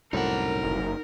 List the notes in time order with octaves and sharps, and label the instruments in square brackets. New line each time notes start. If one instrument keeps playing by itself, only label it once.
[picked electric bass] C2 F#2 A2 [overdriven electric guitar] D#4 F#5 [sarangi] A#4
[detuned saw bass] F#1